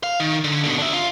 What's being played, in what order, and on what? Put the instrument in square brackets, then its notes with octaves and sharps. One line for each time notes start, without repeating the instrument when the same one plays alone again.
[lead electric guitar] F5
D#3
D3
B2 D3
D4 E5
F4